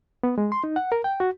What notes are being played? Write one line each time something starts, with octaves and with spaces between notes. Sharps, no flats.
B3
G#3
C6
D#4
F#5
A#4
G5
F#4